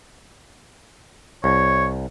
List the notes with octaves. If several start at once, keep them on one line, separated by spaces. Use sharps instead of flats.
C2 C#5